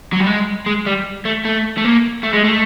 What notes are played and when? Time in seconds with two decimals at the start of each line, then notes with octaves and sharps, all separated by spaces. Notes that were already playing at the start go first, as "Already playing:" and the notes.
0.13 F#3
0.20 G3
0.27 G#3
0.66 G#3
0.86 G3
1.25 A3
1.45 A3
1.78 A3
1.85 A#3
2.23 A3
2.33 G#3
2.44 A3